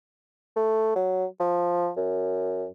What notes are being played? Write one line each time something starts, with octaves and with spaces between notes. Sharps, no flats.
A3
F#3
F3
F#2